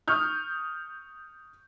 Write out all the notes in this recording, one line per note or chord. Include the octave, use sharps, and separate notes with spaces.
C#6 D#6 F6 G6